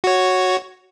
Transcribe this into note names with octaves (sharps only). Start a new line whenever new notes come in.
F#4 C#5